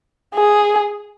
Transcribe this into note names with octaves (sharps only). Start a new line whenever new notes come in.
G#4